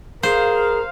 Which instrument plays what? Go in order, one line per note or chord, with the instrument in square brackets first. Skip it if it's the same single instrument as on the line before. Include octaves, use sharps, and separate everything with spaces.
[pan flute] G#4 [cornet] A#4 [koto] C5 [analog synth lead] F5